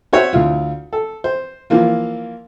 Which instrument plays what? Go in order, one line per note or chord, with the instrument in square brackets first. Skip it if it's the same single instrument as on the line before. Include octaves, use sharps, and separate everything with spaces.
[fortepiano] F#4 C5 C#5 E5 F#5
D2 E4 F4
A4
C5
E3 F3 A#3 F4